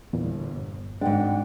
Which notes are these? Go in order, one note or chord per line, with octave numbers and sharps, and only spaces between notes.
G1 E2 A#2
G#1 G#2 G#3 D4 F#5 G5